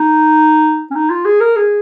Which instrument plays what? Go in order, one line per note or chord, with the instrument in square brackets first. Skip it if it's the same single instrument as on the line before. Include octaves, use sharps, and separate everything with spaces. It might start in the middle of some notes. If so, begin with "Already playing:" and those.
Already playing: [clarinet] D#4
C#4
D#4
F4
G#4
A#4
G#4